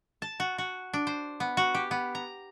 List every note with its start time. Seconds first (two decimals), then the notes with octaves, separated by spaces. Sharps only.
0.22 A5
0.40 F#4
0.58 F#4
0.94 D4
1.07 C5
1.40 B3
1.57 F#4
1.75 G4
1.91 B3
2.15 A#5